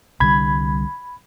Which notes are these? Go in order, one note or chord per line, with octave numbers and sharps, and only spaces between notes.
C2 D3 G3 B5 G#6